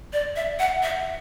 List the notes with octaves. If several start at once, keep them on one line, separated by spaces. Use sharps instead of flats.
D5
E5
F#5
E5